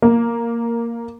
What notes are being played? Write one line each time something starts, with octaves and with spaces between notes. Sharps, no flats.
A#3